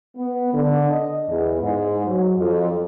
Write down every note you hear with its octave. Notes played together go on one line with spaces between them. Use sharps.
B3
D3
D#5
E2
G#2
F#3
F2